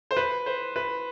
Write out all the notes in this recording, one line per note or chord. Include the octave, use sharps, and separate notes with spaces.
C5
B4
C5
B4